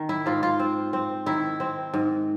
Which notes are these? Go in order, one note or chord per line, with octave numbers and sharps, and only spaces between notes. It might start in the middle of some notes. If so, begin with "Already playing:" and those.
Already playing: D#3
E4
G#2 F4
F4
C4
C4
D#3 E4
C4
G#2